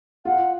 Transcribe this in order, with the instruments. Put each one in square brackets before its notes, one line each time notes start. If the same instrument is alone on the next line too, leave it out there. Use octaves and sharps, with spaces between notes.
[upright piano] F4 [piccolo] F#5